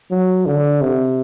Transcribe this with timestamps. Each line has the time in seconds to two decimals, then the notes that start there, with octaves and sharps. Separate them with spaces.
0.11 F#3
0.46 D3
0.81 C3